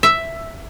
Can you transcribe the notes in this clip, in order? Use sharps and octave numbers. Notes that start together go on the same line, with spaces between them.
E5